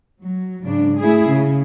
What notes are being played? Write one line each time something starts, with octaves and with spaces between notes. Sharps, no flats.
F#3
G#2 C#3 D4
A3 E4 G#4
C#3